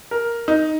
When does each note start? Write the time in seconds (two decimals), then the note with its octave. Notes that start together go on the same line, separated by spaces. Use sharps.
0.11 A#4
0.48 D#4